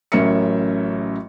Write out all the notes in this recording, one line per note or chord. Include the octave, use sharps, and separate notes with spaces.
A1 F#3 C#4 A#4 E5 C#7